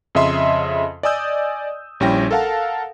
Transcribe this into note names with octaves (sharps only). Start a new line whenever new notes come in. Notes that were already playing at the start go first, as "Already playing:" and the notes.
F2 C#3 D#5 E5 C6
D5 D#5 G#5 D#6 E6 G6
A#1 G3 C#4 E4 G5 A#6
A4 A#4 F5 F#5 A5